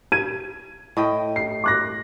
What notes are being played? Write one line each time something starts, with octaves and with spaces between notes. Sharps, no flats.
G#6 D#7
A2 D#5 G5
C7
D6 F#6 A#6